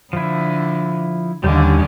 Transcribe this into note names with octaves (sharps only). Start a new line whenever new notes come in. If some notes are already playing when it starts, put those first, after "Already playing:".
D3 F3 E4
D#2 D3 G3 C#4